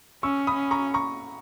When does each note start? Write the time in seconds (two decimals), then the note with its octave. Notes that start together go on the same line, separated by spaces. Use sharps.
0.23 C#4 C#6 E6
0.47 B5 D#6
0.55 C#4
0.71 A#5 C#6
0.94 A#5 C#6